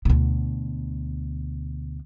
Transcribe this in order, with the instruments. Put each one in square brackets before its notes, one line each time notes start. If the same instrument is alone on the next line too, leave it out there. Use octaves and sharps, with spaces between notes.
[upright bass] D2 B2